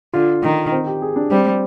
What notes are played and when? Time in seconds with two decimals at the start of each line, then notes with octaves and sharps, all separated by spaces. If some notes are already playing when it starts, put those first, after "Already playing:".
0.13 D3 F4
0.43 D#3
0.72 C4
0.86 G4
1.02 G#4
1.16 D4
1.30 G3 C4